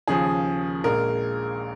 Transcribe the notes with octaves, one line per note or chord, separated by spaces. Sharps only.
D#2 C#3 F3 G#4
A#1 A#2 G#3 A#4